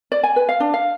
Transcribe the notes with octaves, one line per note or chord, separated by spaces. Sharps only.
D5
G#5
B4
F5
D4
F5